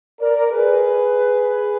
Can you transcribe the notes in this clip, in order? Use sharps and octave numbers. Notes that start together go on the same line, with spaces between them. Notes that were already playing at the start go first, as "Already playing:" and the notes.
A#4 D5
G#4 B4